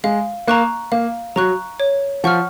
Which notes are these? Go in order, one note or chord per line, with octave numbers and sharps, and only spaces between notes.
G#3 F5
A#3 A#5 C#6 F#6
A#3 F5
F#3 A#5 C#6 F#6
C#5
F3 F#5 C#6 F6